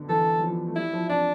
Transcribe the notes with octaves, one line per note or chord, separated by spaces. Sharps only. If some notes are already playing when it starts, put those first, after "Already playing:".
Already playing: B2 D3
E3 A4
G3
F3
A3
G3 E4
F3
C3 D4